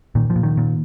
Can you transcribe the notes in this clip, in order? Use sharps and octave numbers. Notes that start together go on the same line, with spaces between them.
A#2 D#3
F3
A#2
D#3
A#2